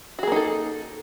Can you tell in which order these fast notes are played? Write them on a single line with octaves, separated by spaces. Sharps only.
F#4 G#4 A#3 D#4 A4